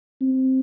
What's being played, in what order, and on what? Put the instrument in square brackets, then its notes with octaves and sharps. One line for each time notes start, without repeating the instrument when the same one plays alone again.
[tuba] C4